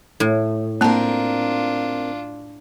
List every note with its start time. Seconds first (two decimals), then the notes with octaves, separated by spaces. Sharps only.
0.20 A2
0.81 A#3 C4 D4 F4 A#4 A5